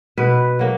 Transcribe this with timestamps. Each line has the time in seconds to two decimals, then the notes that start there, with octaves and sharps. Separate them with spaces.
0.18 B2 B4
0.59 F#3 A#3